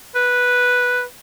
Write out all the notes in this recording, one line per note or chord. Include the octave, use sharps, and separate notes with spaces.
B4